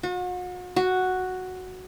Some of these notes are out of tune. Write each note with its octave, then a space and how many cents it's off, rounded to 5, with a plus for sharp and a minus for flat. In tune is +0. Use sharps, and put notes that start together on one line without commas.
F#4 -40
F#4 +0